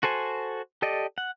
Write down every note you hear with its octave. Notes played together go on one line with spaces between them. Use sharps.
F#4 A4 C5 G#5
G4 A4 D5 D#5
F#5